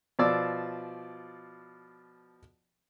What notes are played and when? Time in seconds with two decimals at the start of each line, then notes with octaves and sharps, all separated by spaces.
0.19 B2 F3 D5 E6